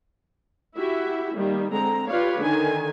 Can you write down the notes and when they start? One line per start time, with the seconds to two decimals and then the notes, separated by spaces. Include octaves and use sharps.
0.78 E4 F#4 G4 E5
1.36 D#3 G3 A#3
1.73 D3 G#3 C4 A4 A#5
2.08 F4 G4 B4 C#5 D5 F5
2.40 D3 D#3 G#5